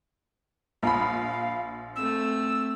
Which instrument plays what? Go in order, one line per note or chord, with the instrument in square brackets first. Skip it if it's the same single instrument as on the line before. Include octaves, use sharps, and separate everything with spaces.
[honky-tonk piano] A#1 B5 [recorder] F5
[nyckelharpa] A3 C4 [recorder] E6